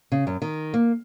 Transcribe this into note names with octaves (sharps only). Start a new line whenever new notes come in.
C#3
F#2
D#3
A#3